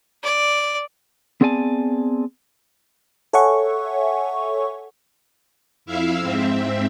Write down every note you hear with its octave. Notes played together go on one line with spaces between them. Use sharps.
D5
B3 C4 G#4 D5 G#5 A5
A4 C#5 E5 F#5 G#5 C#6
F2 E4 E5 F5
G#2 C4 E5